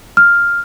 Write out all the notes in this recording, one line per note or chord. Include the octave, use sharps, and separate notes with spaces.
F6